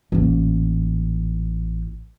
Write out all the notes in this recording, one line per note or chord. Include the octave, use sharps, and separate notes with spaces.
A1 A#2